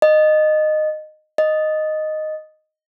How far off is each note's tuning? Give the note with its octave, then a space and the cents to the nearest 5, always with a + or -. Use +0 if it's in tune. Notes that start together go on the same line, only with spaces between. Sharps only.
D#5 -15
D#5 -5